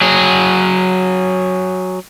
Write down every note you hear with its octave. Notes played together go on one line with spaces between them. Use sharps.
F#3 G#4